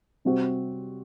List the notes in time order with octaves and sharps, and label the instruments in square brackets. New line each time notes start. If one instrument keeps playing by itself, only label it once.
[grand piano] C3 G3 C4 F#4